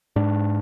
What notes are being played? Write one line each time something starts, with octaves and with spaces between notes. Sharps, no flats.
G#2 D4